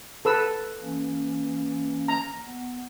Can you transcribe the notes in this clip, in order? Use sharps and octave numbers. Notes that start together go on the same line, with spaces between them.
A4 B4 E6
E3 A#3 C#4
A#5
B3